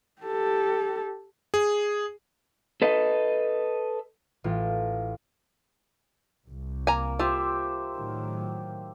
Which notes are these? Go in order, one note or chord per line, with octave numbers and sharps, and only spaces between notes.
G4 A4
G#4
A4 B4 D#5
A1 F4 A4
C2
A#3 G#5 A#5
F4 G4 C5 E5
A2 D#3 F#3